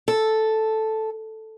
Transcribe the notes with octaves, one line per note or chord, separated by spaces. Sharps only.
A4